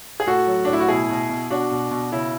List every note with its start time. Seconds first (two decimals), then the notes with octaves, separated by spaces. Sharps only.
0.20 G#4
0.27 A2 F#4 A4
0.47 F#3
0.65 D4
0.68 A2
0.73 E4
0.80 F#4
0.88 B2 E4 G#4
1.10 B2
1.30 B2
1.50 B2 D4 F#4
1.71 B2
1.91 B2
2.12 C#3 E4